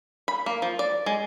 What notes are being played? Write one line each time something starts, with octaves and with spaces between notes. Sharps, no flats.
B5
A#3
F3
D5
G#3